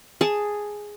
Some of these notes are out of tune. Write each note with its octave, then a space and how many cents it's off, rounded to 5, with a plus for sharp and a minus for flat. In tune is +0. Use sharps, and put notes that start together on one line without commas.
G#4 +0 A5 +0